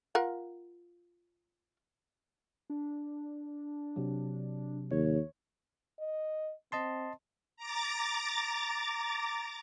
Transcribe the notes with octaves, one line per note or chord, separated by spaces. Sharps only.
F4 A#4 F#5
D4
C3 F#3
D#2 C#5
D#5
C4 D#5 A5 C6
A#5 D6 A6